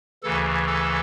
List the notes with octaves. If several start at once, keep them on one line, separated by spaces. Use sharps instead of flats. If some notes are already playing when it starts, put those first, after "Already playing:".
D2 C#3 E3 A4
A4